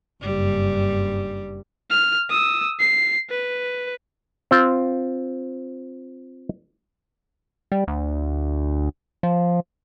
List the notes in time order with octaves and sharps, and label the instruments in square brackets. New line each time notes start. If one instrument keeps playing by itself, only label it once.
[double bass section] F#1 G2 [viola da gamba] G3
[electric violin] F6
D#6 E6
C7
B4
[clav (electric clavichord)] C4 F4
[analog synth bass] G3
D2
F3